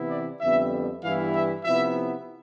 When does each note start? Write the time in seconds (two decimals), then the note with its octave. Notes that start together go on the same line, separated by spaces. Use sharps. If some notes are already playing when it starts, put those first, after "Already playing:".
Already playing: C3 E3 B3 E4
0.10 D5
0.41 F2 D3 G3 B3 E5
1.03 G2 E3 G3 B3 E4 F5
1.34 E5
1.64 C3 F3 B3 E4 E5